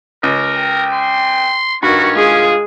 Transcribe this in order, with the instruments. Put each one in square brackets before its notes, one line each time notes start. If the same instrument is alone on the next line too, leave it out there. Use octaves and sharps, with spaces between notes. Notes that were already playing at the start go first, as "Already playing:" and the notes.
[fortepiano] C#2 [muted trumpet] A#4
[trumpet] G5
[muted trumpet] C6
[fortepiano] G2 [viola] D#3 F#4 [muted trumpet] C#4
[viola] G#3 G#4 [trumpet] F4